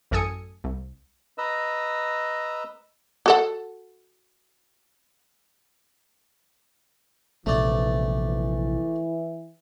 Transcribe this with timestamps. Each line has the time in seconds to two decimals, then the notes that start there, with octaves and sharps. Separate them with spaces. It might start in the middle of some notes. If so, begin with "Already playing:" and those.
0.11 A1 F#2 A4 G#5 D#6 C#7
0.64 C2
1.38 B4 D#5 A#5 E6
3.26 F#4 A4 F#5
7.46 A#1 C3 E3 A3 D5